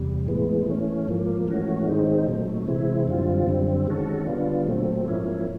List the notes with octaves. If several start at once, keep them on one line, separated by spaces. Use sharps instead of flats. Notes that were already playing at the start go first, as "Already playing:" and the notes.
Already playing: E2 C3 G3
A2 E3 G#3 B3
E3 A3 C#4
G#2 F3 A#3
G#2 E3 A3 C#4 F#4
D#3 G#3 C4 D#4
A#2 F#3 A3
C3 E3 G#3 C4 E4
F#2 D3 G3 C4 F4
F#2 D3 G3 C4
D#3 G#3 C#4 F#4 A4
D3 G3 B3 D4 F4
A#2 F#3 A3 C4
G#2 F3 A#3 C#4 E4